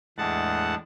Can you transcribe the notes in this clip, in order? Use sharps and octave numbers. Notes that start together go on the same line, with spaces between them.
E2 A2 G#3 D4 F#5 A5